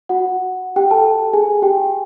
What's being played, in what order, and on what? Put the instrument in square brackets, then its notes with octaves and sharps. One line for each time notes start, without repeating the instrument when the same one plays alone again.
[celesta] F#4 F#5
G4 G5
A4 A5
G#4 G#5
G4 G5